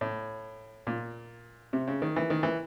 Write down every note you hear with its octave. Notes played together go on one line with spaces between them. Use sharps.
A2
A#2
C3
C#3
D#3
E3
D#3
E3